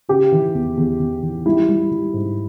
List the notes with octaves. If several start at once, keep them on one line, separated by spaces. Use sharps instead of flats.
C#3 G4
E3
E2
E2
E2
E3
G3 E4
G3
G3
G#2